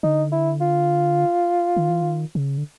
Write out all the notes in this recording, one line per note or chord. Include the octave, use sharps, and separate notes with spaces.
D3 D#4
E4
F4
D#3
E3
D#3
C#3
D3